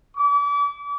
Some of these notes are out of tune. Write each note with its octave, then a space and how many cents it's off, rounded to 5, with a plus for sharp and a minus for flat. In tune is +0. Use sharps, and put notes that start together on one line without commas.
D6 -40